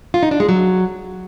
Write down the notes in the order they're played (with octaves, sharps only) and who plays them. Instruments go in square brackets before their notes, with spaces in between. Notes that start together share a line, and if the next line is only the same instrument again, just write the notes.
[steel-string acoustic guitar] F4
D#4
D4
G#3
F#3